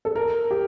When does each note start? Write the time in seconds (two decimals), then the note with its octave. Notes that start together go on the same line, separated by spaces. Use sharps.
0.05 A4
0.16 A#4
0.51 G4